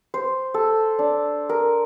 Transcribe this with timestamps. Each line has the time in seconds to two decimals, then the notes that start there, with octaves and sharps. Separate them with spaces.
0.14 C5
0.54 A4
0.99 D4
1.49 A#4